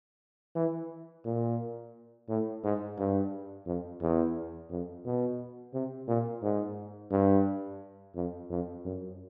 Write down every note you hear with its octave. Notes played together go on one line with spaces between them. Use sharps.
E3
A#2
A2
G#2
G2
F2
E2
F2
B2
C3
A#2
G#2
G2
F2
F2
F#2